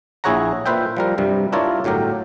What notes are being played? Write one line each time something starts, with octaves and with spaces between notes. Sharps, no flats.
A#1 E4 G#4 C#5 F#5 A#5
A#2 B4 C5 E5 G5
F3 G3 A#4
G2 C3 G3
D4 E4 F4 A#4 C#5 D5
G1 A2 F#3 G4 A#4